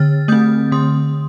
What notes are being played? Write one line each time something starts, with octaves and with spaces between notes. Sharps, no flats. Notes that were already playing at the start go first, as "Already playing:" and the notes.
Already playing: D3 F6 A6
A3 C4 D#6 G6
D3 C6 D#6